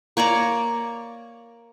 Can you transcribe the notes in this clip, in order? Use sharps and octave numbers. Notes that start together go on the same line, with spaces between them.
A#3 C#5 D5 A#5